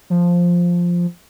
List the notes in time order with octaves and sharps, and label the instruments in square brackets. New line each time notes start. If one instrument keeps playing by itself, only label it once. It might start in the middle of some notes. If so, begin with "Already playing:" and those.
[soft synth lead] F3